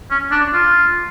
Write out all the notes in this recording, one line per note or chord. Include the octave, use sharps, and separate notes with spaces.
C#4
D4
F4